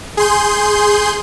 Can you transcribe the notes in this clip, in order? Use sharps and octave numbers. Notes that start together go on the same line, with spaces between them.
G#4 C6 G6